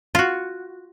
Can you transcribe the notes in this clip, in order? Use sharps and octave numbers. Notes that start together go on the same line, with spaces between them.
F4 F#4